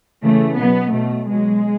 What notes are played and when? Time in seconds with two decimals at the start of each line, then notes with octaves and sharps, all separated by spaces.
0.23 C#3 E3 A3
0.58 B2 F#3 B3
0.93 B2 F#3 A3
1.30 B2 F#3 G#3